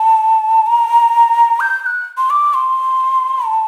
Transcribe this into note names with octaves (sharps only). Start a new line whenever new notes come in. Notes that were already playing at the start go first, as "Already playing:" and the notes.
Already playing: A5
A#5
G6
G6
F#6
C6
D6
C6
A5